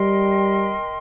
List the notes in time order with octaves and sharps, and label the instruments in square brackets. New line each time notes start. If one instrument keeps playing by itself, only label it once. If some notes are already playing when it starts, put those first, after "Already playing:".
Already playing: [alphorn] G3 [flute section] A#4 D#5 G5 C6